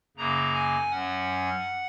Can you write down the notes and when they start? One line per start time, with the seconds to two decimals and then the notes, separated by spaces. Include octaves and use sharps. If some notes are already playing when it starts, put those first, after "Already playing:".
0.17 F#2 C#3 A#3 A#5
0.53 G#5
0.91 F#2 F#3 C#4 F#5